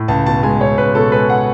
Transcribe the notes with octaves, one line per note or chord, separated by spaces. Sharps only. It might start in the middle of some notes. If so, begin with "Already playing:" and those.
Already playing: A2
C#2 A5
B2 A5
G#3 G#5
C#2 C#5
C#2 B4
B2 A4
G#3 B4
F#5